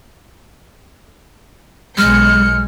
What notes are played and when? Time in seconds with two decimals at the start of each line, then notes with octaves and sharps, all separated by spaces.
1.98 B1 G#3 F6 G6 C#7